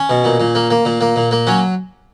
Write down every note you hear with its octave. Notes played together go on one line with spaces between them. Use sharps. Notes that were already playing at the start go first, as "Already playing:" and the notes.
Already playing: C#4
B2
A#2
A#2
A#3
A#3
A#2
A#3
A#2
A#3
F#3 C#4